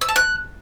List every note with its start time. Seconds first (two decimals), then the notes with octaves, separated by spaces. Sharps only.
0.01 E6
0.09 A5
0.16 F#6